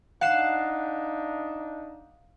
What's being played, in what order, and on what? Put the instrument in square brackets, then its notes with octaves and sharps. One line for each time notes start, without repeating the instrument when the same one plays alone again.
[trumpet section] D4 D#4 [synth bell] F5 [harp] F#5 C7 E7